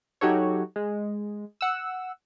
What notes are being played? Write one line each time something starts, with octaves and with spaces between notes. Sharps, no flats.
F#3 D#4 F#4 G4 A4 C#5
G#3
F#5 E6